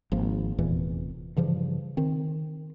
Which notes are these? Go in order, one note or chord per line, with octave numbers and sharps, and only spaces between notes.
G#1 F3 A#3
F1 E2 A#2 E3
G2 C#3 E3 F3
D#3 C4